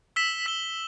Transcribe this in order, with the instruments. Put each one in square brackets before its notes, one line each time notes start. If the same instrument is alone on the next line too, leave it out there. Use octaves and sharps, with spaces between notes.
[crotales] E6 B6 E7 G7
E6 B6 E7 G7